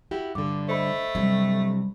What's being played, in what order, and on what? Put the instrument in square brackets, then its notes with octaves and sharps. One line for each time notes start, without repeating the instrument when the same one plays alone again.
[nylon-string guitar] E4 F#4 G4
[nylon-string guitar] G2 D3 [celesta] D6
[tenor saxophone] A3 [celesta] C5 D#5 B5
[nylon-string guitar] G2 C3 [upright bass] F#3 G3